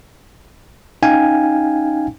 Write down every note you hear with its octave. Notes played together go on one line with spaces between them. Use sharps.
C#4 D#4 F5 G5 G#5